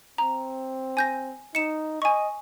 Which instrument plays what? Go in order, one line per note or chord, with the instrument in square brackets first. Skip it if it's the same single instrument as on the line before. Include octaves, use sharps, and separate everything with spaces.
[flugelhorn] C4 [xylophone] A#5
[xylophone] G#5 G6 A#6
[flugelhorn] D#4 [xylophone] C#7 E7
[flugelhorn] D#5 [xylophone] G#5 C#6